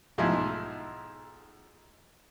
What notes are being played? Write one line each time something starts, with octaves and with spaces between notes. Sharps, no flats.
B1 G#2 F3 E4 G#5